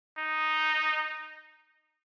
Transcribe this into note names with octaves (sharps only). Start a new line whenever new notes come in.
D#4